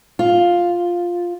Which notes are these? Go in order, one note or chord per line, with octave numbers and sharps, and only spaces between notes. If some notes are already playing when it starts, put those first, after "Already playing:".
F4